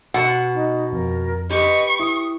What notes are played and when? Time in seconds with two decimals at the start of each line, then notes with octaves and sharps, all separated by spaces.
0.14 B2 F#5
0.54 D#4
0.93 F2 A#4
1.50 G4 B4 D#5 C#6
2.00 E4 D#6